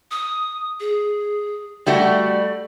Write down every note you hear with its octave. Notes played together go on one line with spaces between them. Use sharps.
D#6
G#4
G3 A3 F#4 D5